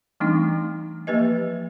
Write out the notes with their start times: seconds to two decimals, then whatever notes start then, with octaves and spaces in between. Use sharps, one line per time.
0.20 E3 G3 A3 C4 D4 D#4
1.07 F3 A#3 G4 B4 D#5